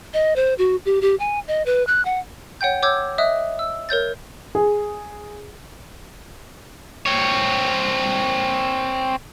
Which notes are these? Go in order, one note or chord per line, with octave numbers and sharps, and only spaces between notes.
D#5
C5
F#4
G4
G4
G#5
D#5
B4
F#6
F#5
C#5 F#5 G5 G6
C#5 D6 E6 G6 G#6
D#5 E5 D#6 F#6
E6
A#4 C#5 G6 A6
G#4
C4 C#5